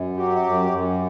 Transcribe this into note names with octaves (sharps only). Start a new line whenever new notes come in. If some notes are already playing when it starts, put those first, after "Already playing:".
Already playing: F#2
F#3 G4
F#2
F#2